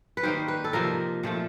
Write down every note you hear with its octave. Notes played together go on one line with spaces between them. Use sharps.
B4
D#3 G3 A#3 D#4 C5
B4
A4
C3 F3 A#3 D#4 A#4
A#2 F3 A3